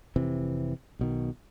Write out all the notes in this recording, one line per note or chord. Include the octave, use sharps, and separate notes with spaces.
F1 C3 E3 C4
B1 B2 D#3